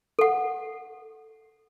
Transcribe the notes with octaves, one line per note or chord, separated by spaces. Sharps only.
A4 F#5